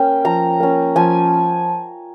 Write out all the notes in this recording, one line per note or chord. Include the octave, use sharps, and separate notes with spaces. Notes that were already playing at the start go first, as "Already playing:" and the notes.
Already playing: A#3 C#4 G5
F3 A#5
A#3 C#4
F3 G#5